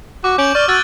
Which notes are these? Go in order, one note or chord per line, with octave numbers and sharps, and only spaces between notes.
F#4 D6
C#4 G6 D7 F#7
D5 C#6 F6
F#4 E6 F#6 A6